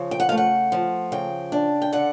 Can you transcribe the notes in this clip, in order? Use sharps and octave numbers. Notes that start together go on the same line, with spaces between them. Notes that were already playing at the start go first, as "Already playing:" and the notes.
Already playing: C#3 F3
G5
F#5
A3 F5
F#5
F3
C#3 G5
D4
G5
D3 F#5